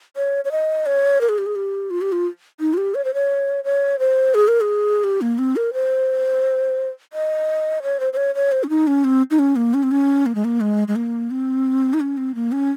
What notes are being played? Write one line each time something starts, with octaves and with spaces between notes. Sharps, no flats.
C#5
C#5
D#5
C#5
A#4
G#4
G4
G#4
G4
F4
G4
F4
D#4
F4
G4
C#5
C5
C#5
C#5
C5
G#4
A#4
G#4
G4
A#3
C4
A#4
C5
D#5
C#5
C5
C5
C#5
C#5
C5
C#4
D#4
C#4
C4
D#4
C#4
A#3
C#4
C4
C#4
A#3
G#3
A#3
G#3
G#3
A#3
C4
D#4
C#4
C4
A#3
C#4